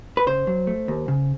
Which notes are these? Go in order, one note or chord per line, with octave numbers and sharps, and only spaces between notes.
B4
C#3 C5
F#3
A3
D#2
C#3